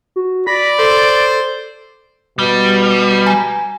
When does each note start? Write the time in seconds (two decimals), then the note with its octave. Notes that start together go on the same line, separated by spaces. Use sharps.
0.16 F#4
0.47 D5 B5 A#6
0.79 A4 C5
2.39 B2 G3
3.27 G#5 A#5